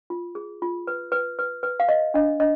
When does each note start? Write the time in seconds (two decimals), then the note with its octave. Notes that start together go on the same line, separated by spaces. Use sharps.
0.10 F4
0.35 G#4
0.62 F4
0.87 B4
1.12 B4
1.39 B4
1.63 B4
1.80 F5
1.89 B4 D#5
2.14 D4 D#5
2.40 D4 D#5